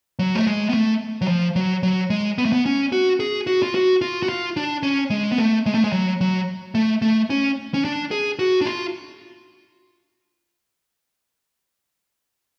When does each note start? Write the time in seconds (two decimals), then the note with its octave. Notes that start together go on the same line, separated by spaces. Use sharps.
0.19 F#3
0.35 A3
0.47 G#3
0.69 B3
0.74 A3
1.21 F#3
1.28 F3
1.56 F#3
1.83 F#3
2.10 G#3
2.38 B3
2.45 A3
2.52 B3
2.66 C#4
2.92 F#4
3.20 G#4
3.47 F#4
3.63 F4
3.75 F#4
4.02 F4
4.23 F#4
4.29 F4
4.57 D4
4.83 C#4
5.10 G#3
5.31 B3
5.38 A3
5.66 G#3
5.74 A3
5.84 G#3
5.93 F#3
6.21 F#3
6.75 A3
7.02 A3
7.30 C#4
7.74 C#4
7.85 D4
8.11 G#4
8.39 F#4
8.61 D4
8.66 F4